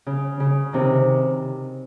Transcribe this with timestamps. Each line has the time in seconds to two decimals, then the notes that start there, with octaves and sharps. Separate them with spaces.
0.06 C#3
0.40 C#3
0.73 C3 D#3